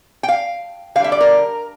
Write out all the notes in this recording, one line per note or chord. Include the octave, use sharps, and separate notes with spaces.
G5
F5
D3 G3 E5 F5
D5
A#4